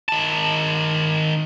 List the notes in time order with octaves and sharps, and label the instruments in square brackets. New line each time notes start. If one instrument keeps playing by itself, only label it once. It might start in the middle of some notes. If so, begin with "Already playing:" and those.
[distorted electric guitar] D#3 A5